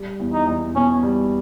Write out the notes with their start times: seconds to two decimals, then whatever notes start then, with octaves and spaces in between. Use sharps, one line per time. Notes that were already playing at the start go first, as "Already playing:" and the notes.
Already playing: G3
0.20 E2
0.33 D#4
0.47 E2
0.75 B2 C#4
1.03 G3